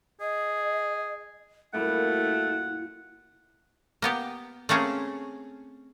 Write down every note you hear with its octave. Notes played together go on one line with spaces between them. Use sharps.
G#4 D#5
F#2 A#2 G3 A3 E4 F#5
A#3 B3 G4
A3 A#3 C4 C#4 G#4